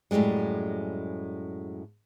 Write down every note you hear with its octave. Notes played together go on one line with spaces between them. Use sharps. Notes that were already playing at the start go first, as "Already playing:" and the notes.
F#2 A2 D3 G3 G#3